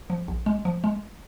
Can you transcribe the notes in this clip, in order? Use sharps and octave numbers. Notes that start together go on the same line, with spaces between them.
F3
A#1
G#3
F3
G#3